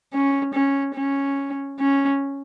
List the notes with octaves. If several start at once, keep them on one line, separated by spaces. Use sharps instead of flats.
C#4
C#4
C#4
C#4